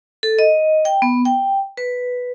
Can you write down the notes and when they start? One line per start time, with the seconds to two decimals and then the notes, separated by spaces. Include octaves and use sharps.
0.23 A4
0.39 D#5
0.85 G5
1.02 B3
1.25 G5
1.77 B4